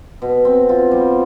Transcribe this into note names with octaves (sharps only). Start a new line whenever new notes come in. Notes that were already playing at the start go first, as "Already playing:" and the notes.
B2
C4
F4
G3